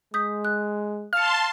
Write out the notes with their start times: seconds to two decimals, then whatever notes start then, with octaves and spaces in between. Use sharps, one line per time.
0.14 G#3 D#6 G6 B6
0.45 F#6
1.13 F5 A5 C6 F6 C#7